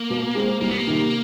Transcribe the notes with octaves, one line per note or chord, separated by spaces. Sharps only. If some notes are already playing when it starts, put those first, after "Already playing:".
Already playing: A#3
B2
G#3 C4
C2 A#3
B3
A#3
C3 D#3